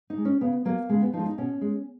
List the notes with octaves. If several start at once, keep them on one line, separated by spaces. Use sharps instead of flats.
D#4
G#3
C#4
C#3 B3
F#3 A#3
C#3 G#3
B3
F3 G#3 D#4 F4
D#4
B2 C#4
G#3